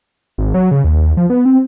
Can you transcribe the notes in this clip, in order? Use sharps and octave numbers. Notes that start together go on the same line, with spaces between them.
G#1
F#3
C#3
D#2
D#2
F3
B3
C4